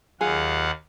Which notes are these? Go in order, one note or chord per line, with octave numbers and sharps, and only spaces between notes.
D#2 F#3 F4 G#4 F5 F#5